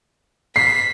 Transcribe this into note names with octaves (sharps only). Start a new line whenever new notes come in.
B6 C7